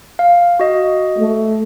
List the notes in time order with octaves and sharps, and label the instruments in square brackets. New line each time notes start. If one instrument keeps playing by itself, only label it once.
[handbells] F5
F#4 D#5
[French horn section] A3